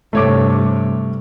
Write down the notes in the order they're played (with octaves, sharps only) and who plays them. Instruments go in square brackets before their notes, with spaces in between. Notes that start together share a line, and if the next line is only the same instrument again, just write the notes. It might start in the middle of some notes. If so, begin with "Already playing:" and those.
[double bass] G2 C3 [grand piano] A3 C#5 D6